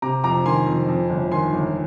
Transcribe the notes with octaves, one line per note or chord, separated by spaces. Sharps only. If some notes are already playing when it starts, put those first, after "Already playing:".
C3 A#5 D6
F2 A#5 D6
D#3 G#5 C6
F2
F2
G1
D#3 G#5 C6
G1